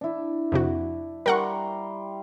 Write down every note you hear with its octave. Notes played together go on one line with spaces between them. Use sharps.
D4 E4
F2 C3 F#4
G3 A#4 F#5 A#5 C6 C#6